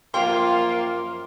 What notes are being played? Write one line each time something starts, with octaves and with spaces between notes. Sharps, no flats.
F#2 F3 A#3 F4 G5 C6